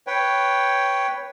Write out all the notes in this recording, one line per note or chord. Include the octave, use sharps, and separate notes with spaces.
B4 C#5 G5